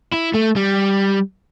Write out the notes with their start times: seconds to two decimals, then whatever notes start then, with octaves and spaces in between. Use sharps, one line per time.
0.13 E4
0.34 A3
0.56 G3